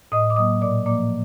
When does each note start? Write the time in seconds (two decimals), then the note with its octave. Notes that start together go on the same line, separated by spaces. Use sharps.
0.12 A2 D#5 D#6
0.30 D6
0.36 F#3 A#3 D#5 D#6
0.62 A#2 D5 D6
0.86 F3 A#3 D5 D6